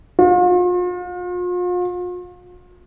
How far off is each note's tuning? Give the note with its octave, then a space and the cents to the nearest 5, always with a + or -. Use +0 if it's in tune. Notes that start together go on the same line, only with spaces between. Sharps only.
F4 +40